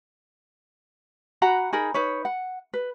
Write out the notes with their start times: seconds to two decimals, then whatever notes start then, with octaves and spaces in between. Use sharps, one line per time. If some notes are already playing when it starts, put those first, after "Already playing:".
1.42 F#4 F#5 A#5 B5
1.73 D#4 G#4 A#4 B5
1.94 D#4 B4 C#5
2.25 F#5
2.74 B4